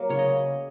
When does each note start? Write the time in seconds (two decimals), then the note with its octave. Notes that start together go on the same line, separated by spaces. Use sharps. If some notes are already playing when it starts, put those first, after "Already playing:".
Already playing: F#3 A#3
0.09 C#3 C#5
0.19 D#5